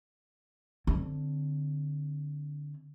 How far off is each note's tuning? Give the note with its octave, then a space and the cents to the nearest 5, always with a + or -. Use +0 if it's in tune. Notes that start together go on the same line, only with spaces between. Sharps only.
D3 +0 C4 +0